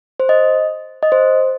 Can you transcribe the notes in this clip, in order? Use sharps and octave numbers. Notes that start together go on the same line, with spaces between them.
C5
D#5
D#5
C5